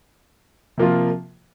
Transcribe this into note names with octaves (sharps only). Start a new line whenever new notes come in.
C3 F3 A#3 F4